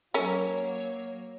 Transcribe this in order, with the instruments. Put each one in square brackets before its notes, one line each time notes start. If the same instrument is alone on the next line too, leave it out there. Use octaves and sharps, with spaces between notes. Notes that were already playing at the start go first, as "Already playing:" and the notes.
[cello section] F#3 A#3 [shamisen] C#4 A#4 [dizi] C#5